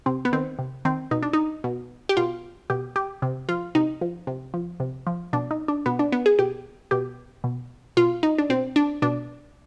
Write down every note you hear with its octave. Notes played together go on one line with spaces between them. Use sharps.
C3 C4
B3
D#3 C4
C3
D#3 C4
B2 D#4
D4
D#4
B2
G4
B2 F4
B2 G4
G4
C3
F3 F4
C3 D#4
F3
C3
F3
C3
F3
B2 D4
D#4
D4
B2 B3
D4
B3
G#4
B2 G4
B2 G4
B2
B2 F4
D#4
D4
B2 C4
D4
B2 D4